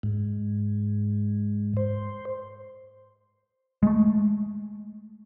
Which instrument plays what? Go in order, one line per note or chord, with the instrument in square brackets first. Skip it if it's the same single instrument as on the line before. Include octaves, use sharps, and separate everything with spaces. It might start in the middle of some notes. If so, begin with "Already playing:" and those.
[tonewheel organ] G#2
C5
[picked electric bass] G#3 A3